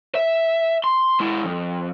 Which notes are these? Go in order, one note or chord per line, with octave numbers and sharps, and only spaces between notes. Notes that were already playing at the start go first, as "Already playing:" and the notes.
E5
C6
G#3 E4
F2